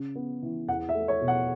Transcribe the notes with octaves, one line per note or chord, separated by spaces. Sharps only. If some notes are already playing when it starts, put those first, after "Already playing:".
Already playing: C#3
B3
E3
E2 F#5
E5
A3
C#5
B2
F#5